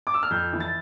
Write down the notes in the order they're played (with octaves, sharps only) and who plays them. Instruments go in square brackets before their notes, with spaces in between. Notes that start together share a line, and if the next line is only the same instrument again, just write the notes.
[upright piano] D6
E6
F6
F2 G6
E3
A6